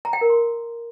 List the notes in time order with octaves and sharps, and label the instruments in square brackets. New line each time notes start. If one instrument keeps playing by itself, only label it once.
[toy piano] A#5
G5
A#4
C6